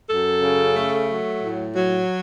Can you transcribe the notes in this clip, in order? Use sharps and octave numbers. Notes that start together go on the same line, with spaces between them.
F#2 A4
C#3
A3
F#3
A2
F#3